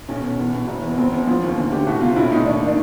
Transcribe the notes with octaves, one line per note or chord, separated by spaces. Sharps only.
B1 C#4
B2
E2
B2
F#1
E2
F#1 C4
E2
F3
D#2
D2 C#4
D3 G4
C2 F#4
C3 F4
B1 E4
A2 D#4
D#2 D4
D#3 D#4
D4